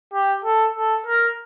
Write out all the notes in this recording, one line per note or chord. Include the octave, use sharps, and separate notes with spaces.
G4
A4
A4
A#4